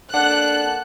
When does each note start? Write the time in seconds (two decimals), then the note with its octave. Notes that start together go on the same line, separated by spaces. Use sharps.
0.14 A#3 D4 A4 F#5 A5 F#6